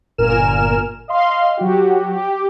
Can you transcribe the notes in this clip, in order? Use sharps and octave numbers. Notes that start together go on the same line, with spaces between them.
G1 A#2 A#4 G#5 F6 E7
D#5 F5 C6
F#3 F#4 G4
G4